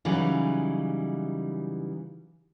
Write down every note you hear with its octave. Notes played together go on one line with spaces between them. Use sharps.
C#3 E3 F#3 G3 D#4